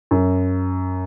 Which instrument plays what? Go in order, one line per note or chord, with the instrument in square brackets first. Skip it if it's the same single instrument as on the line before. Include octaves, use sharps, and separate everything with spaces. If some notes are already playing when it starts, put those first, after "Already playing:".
[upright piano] F#2